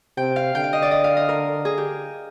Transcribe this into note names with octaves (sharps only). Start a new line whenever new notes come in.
C3 G5
F5
D3 G5
F5
D#5
D5
D#5
F5
D#5
A#4
G#4
G4